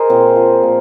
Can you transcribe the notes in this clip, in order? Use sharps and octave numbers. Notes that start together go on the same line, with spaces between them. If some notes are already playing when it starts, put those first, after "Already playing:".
Already playing: G#4 A#4 C5 D#5
A#2 C4
F3
A#2